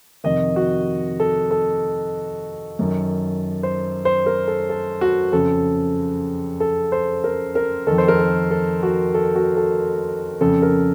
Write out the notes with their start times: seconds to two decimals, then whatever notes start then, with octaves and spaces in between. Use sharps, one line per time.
0.24 F2 C3 D#3 D#5
0.56 F#4
1.20 A4
1.51 A4
2.79 F#2 D#3
3.63 C5
4.05 C5
4.26 A#4
4.48 A4
4.70 A4
5.01 F#4
5.33 F2 C#3 A4
6.60 A4
6.92 C5
7.24 A#4
7.55 A#4
7.87 F2 D#3 A4
7.98 C5
8.08 A#4
8.19 A4
8.51 A4
8.83 F#4
9.14 A4
9.35 F#4
9.57 A4
10.41 F2 C#3 A4
10.62 A#4